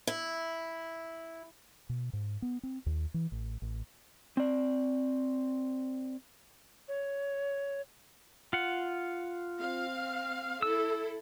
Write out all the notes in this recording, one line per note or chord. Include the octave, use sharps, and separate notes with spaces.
E4
B2
G#2
B3
C4
D#2
E3
A1
A1
C4 D5
C#5
F4 F#5
C4 F5
E4 A4 E6